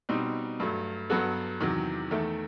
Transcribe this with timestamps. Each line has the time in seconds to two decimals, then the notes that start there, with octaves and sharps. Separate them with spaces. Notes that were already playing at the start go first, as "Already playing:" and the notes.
0.09 B2 G3 C4 D#4
0.60 G2 F#3 A3
1.10 G2 F#3 B3 F#4 A4
1.61 E2 C3 D#3 F#3
2.11 E2 D#3 A3 E4 A4